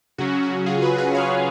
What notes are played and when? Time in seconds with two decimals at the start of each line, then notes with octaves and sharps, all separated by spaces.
0.18 C#3 F#3 C#4 F#4
0.43 F#4
0.66 F4 G#4
0.82 G#4 B4
0.98 G#4 B4
1.14 C#5 F5